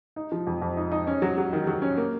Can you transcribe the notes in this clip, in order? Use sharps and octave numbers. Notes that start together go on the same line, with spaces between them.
D#4
F3
F2
F2
D#4
D#4
C#4
F#3
F#3
D#3
F#3
C#4
A#3